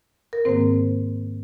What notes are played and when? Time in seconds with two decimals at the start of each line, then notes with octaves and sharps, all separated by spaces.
0.33 A#4
0.45 G#2 D#3 A#3 C4 C5